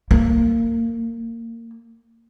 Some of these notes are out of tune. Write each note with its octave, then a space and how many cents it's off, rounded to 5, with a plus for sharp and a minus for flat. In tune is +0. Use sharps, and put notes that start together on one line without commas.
A#3 -25